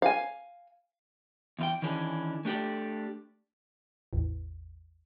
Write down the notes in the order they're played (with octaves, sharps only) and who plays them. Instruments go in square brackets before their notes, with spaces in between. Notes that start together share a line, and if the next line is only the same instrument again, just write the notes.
[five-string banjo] F5 G#5
[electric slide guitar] E2 F4 G5
D#3 E3 C#4 D4 G#4
A3 D4 G4 A4 D5
[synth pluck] A1 E2